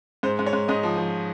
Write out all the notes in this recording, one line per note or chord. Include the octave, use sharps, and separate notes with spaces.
G#2 C5
G#2
C#5
G#2
G#2 D#5
F3
F3